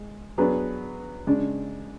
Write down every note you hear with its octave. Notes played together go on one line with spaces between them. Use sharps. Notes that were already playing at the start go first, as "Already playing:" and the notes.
Already playing: G#3
F#3 B3 D4 G#4 B4
C#3 G#3 D4